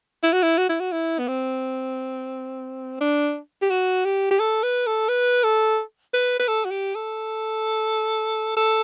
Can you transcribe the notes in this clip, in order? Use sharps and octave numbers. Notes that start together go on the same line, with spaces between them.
E4
F#4
E4
F#4
E4
F#4
E4
B3
C4
D4
G4
F#4
G4
G4
A4
B4
A4
B4
A4
B4
B4
A4
F#4
G4
A4
A4